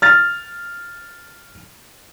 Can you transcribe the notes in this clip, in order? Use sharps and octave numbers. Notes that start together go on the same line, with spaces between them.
F6 A6